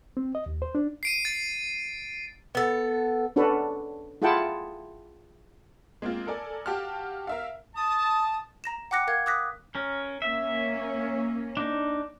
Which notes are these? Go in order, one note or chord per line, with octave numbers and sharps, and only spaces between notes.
C4
D#5
D#2
C5
D4
C7 D7 D#7
A6
B3 A4
C#4 D4 F#4 A4 B4
E4 F4 G#4 F#5 G5 A5
G#3 A#3 C4 F4
A4 A#4 D5 G#5
F#4 G4 F5 G5 A5 F6
A#4 E5 F5
A5 D#6
A#5 A#6 E7
F#5 G5 D6 F#6 A#6 C#7
A#4 F5 G#6
D6 D#6 F#6 A#6 B6
C#4 A#4
A#3 C#4 E5
D4 D#4